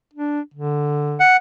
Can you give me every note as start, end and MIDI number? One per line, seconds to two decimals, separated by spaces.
0.13 0.40 62
0.54 1.20 50
1.20 1.37 78